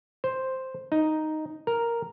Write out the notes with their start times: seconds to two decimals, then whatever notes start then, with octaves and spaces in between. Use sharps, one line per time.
0.24 C5
0.92 D#4
1.67 A#4